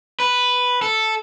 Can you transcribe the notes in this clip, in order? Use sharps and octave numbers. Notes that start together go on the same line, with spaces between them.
B4
A4